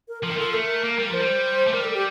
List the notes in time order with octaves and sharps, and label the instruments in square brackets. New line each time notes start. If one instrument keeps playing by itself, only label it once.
[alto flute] A#4
[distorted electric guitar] F3 [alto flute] A#4
[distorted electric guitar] D#3
[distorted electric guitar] F3 [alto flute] A4
[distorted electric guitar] A3 [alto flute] A#4
[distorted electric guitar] A#3
G3
[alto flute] A#4
[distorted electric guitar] F3 [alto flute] C5
[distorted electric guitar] G3
A3
[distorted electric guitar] G3 [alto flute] A#4
[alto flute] A4
G4